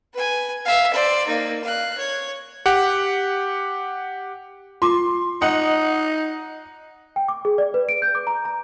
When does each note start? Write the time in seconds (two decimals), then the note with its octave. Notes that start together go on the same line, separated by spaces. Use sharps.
0.13 B4 G#5
0.65 E5 F5
0.93 C5 D5
1.27 A#3 D#4
1.64 F5 F#6
1.97 C#5
2.66 G4 F#5
4.82 F4 A5 C6 D6
5.42 D#4 D#5 F#5
7.16 G5
7.28 D6
7.45 G#4
7.58 D5
7.74 B4
7.89 D7
8.02 G6
8.15 D6
8.27 A#5
8.45 A#5